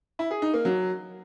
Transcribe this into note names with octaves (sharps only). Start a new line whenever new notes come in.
E4
G#4
D#4
A#3
F#3